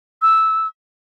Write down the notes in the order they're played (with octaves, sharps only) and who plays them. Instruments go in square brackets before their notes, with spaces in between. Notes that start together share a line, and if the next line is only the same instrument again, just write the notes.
[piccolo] E6